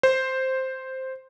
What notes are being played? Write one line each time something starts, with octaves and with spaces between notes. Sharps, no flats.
C5